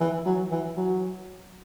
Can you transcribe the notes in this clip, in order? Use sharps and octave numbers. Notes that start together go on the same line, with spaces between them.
E3
F#3
E3
F#3